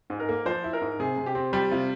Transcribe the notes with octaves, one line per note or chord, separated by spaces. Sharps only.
G#2
A#4
A#3
F3 C5
E4
A#4
G#2
C3 G#4
C3
G4
C4
G3 G4
C3 F4